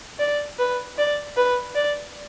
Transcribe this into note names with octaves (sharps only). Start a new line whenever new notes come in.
D5
B4
D5
B4
D5